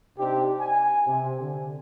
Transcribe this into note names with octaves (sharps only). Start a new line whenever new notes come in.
C3 C4 D4 D#4 G4
G#5
C3
D3